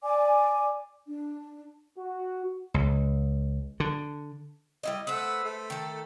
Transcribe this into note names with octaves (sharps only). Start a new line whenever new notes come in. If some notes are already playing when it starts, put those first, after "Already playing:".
D5 G#5 D6
D4
F#4
C#2
D3
G3 E4 D#5
A3 B4 C5 F#5 E6
A3
D#3 A4